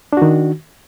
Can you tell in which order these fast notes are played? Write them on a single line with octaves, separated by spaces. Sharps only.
D4 F#4 D#3